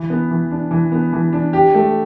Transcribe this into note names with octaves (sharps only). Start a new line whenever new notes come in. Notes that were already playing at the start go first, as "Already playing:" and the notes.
Already playing: E3
B3
E3
D4
E3
B3
E3
D4
G4
A3